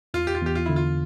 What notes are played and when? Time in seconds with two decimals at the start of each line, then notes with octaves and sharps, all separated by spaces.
0.14 E2 F4
0.27 G4
0.35 F4
0.42 E2 G4
0.55 F4
0.66 D3 E4
0.76 F4